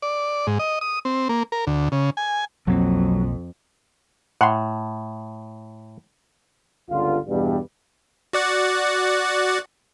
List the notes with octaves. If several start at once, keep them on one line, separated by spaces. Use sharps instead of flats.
D5
G#2
D#5
D#6
C4
A#3
A#4
D2
C#3
G#5
B1 F2 F#3 A#3 C4
A2 F#5 C6
G1 C#2 D3 F4
E2 G2 B2 E3 G3
F#4 D5 F#5